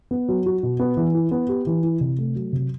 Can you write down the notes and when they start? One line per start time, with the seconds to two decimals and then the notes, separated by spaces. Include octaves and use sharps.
0.11 B3
0.28 F#3
0.46 F#4
0.63 B2
0.79 B3
0.97 E3
1.14 E4
1.31 B3
1.49 G4
1.67 E3
1.83 E4
2.00 C3
2.18 A3
2.35 F#3
2.52 C3